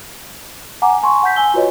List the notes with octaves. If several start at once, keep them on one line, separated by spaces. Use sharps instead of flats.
F#5 G#5 A#5 D6
G#5 A5 C6 C#6
F#5 A5 G6 B6
G#5 A5 E6 G7
F4 F#4 B4 C#5 D#5